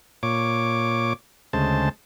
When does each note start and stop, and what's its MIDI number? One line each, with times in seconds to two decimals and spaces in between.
0.23 1.13 46
0.23 1.13 73
0.23 1.13 86
1.53 1.89 38
1.53 1.89 49
1.53 1.89 56
1.53 1.89 72
1.53 1.89 81